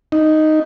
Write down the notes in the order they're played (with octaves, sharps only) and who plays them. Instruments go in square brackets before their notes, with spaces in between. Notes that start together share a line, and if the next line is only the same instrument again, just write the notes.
[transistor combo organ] D#4